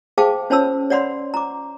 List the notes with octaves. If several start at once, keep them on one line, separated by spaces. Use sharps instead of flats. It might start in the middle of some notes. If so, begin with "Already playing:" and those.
G#4 C5 F5 G5 A5 D6
C#4 C5 C#5 A5 B5 E6
C#5 D5 F#5 B5 C6
A#5 D6